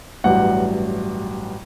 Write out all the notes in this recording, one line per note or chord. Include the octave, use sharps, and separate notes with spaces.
A1 G2 F#3 F#5